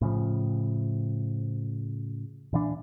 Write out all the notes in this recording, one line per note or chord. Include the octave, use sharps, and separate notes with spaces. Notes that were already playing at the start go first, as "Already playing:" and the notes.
A2 C#3 F3
A#2 E3 D4